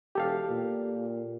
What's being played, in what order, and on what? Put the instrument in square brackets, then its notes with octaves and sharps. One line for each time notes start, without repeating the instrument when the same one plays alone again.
[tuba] E1 [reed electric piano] G4 A4 F5
[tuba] A#2